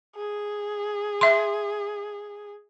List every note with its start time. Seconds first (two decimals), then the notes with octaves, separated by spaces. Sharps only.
0.16 G#4
1.21 E5 C6